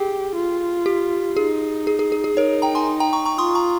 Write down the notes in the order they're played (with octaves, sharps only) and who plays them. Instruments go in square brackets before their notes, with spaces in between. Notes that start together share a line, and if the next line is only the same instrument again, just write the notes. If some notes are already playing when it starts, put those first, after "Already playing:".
Already playing: [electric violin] G4 [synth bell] G#4
[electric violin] F4
[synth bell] G4
[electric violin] D#4 [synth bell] G#4
[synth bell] G#4
G#4
G#4
G#4
[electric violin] D#4 [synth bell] A#4 C#5
[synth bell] G5 A#5
G#5 C6
G5 A#5
A#5 C#6
A#5 C#6
[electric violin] F4 [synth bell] C6 D#6
[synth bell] A#5 C#6